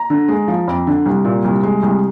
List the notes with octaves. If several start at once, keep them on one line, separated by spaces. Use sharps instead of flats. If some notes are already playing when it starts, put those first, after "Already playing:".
Already playing: A#5
D3
G#3
F3
F2
D3
C2
A#2
C2
G#3
C2